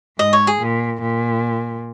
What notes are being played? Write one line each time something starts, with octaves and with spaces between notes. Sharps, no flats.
G#2 D#5
C#5
G#4
A#2
A#2